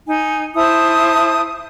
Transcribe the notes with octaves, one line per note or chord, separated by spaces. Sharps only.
D#4 G#5
E4 C5 A5 D#6